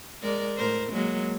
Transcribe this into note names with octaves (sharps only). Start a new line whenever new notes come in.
G#3 A#4 D5
A2 A#4 C5
F#3 G#3 A#3